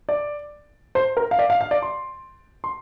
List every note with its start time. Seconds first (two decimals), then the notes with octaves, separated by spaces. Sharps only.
0.09 D5
0.95 C5
1.17 A#4
1.31 F5
1.39 D5
1.50 F5
1.61 F5
1.71 D5
1.83 C6
2.64 C6